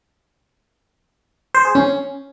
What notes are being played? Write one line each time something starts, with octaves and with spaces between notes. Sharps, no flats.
C5
G#4
C#4